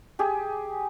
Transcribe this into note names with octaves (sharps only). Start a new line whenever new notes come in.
G4 G#4